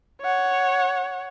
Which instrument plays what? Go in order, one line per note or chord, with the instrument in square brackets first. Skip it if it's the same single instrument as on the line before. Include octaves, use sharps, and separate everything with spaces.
[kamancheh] C#5 F#5